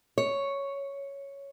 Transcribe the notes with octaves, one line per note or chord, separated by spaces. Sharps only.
C#5